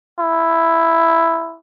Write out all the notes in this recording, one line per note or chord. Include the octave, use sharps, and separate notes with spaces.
E4